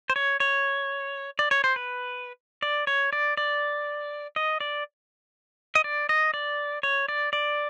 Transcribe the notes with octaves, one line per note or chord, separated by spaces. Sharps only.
C5
C#5
C#5
D5
C#5
C5
B4
D5
C#5
D5
D5
D#5
D5
D#5
D5
D#5
D5
C#5
D5
D5